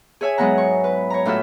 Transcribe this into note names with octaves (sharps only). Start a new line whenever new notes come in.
G#4 C#5 E5 G#5
G#2 F#3 G#3 B3 F#5 A#5
C#6
B4
C#5 A#5
A2 D4 F4 F#4 A4 E5